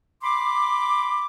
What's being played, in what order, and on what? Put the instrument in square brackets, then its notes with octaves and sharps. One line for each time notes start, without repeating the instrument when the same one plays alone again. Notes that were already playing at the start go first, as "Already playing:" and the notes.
[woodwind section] B5 C6 D6